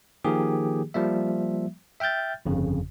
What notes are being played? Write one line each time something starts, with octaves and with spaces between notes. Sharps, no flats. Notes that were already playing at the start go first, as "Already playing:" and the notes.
D#3 F3 A#3 G4 G#4
F3 G3 A#3 E5
E5 G5 F6 G6 A6
G1 F2 C#3